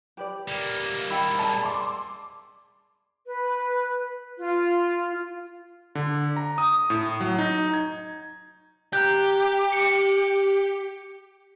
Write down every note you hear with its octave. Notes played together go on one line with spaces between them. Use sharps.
G4 B4 D5
G3 A#3
D#4 G4 B5 E6
G#4 D5 G#5 A5
C6 D6
B4
F4
D3
A#5
D#6
A2
F#3
D#4
G#6
G4 A#5 F#6 G6
C#7 D7